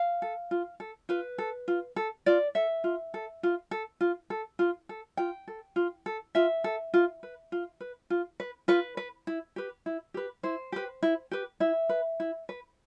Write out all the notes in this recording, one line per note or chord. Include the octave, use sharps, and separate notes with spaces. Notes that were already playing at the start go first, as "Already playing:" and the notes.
Already playing: F5
A4
F4
A4
F4 B4
A4
F4
A4
F4 D5
A4 E5
F4
A4
F4
A4
F4
A4
F4
A4
F4 G5
A4
F4
A4
F4 E5
A4
F4
B4
F4
B4
F4
B4
F4 B4
B4
E4
G4 B4
E4
G4 B4
E4 C5
G4 B4
E4
G4 B4
E4 E5
B4
E4
B4